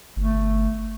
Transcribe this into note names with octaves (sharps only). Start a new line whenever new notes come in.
G1 A3